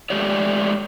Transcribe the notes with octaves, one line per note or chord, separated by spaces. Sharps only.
G#3 A3 G4 C#5 D5